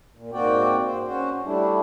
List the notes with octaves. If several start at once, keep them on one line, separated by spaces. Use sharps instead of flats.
A#2
G#2 A#3 C4 F#4 D5 G5
C5
C#4 F#4 C5
G3 A3 D4 E4